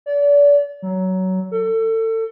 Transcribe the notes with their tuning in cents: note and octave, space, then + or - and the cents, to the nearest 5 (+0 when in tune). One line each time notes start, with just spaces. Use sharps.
D5 -35
F#3 +15
A4 +30